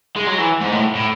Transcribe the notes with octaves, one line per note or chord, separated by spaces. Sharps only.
G#3
F#3
E3
G#2
A2
A2